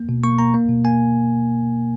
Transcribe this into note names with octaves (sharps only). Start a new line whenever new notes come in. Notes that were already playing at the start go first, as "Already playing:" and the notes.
Already playing: A#3
B2
A#3 C#6
A#3 A#5
A#3
B2
A#3 G#5